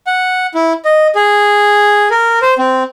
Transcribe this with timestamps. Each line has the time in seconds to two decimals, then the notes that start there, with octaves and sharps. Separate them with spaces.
0.07 F#5
0.55 E4
0.85 D#5
1.15 G#4
2.11 A#4
2.42 C5
2.58 C4